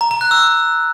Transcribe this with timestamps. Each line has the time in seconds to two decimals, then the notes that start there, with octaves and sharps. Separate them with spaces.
0.01 A#5
0.11 A#5
0.21 F#6
0.31 E6